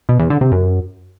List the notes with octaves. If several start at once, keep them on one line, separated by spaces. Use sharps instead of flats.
B2
E2
D3
C3
F#2